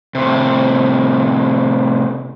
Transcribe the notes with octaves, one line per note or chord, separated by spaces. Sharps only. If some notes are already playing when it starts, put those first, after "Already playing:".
A2 C3